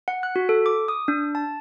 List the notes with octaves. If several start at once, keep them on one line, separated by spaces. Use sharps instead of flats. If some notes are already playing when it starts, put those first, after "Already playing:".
F#5
F#6
F#4
A4
D6
D#6
D4
A5